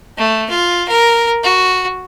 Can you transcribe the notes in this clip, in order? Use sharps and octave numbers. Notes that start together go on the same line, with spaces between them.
A3
F4
A#4
F#4